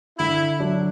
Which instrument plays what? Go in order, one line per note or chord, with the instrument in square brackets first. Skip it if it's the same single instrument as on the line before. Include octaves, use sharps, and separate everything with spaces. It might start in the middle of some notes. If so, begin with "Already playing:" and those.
[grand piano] D3 [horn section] E4
[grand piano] F#3 D4